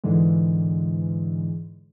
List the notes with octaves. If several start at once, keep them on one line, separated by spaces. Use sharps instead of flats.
G#2 D3 E3 G#3